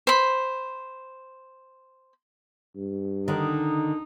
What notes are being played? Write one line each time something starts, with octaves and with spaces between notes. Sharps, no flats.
C5 B5
G2
D3 D#3 D#4